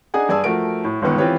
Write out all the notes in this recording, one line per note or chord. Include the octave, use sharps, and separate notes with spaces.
D4 D#4 G#4 F#5 G#5
G2 G#4 D5 G#5 A5 E6
F3 A3 F#4 A#4 D7
A2
G1 C#2 D#3 B3 C#6
E3 C4 F4 G4 B4 C#5